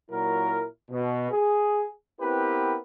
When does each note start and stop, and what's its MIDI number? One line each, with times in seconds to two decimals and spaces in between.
0.11 0.64 46
0.11 0.64 54
0.11 0.64 64
0.11 0.64 70
0.91 1.28 47
1.32 1.86 68
2.21 2.76 59
2.21 2.76 60
2.21 2.76 64
2.21 2.76 67
2.21 2.76 70
2.21 2.76 71